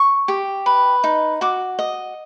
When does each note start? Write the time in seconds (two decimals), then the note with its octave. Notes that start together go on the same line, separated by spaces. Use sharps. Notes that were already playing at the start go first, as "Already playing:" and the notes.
Already playing: C#6
0.28 G4
0.66 B4
1.04 D#4
1.41 F#4 D6
1.79 D#5